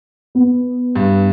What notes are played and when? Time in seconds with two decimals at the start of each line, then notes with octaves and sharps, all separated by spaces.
0.35 B3
0.96 G2